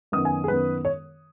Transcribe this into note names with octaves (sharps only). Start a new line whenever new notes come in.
F#2 D#3 B3 D#6
G#5
G#4
F#2 D#3 B3 B4
C#5